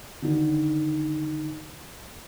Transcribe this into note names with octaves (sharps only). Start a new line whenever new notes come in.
D3 D#3